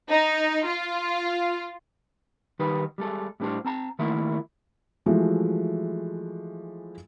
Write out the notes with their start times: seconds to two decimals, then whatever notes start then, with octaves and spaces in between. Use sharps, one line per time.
0.10 D#4
0.66 F4
2.59 D#3 G3 D#4 G4 B4
2.98 G3 G#3 A4
3.40 A2 G3 B3 D4 G4 C5
3.65 C4 A5 A#5
3.99 D#3 A3 A#3 E4 F4
5.06 E3 F3 G#3 A3 F#4